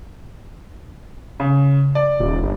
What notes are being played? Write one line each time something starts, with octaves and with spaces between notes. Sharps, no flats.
C#3
D5
D#1
G1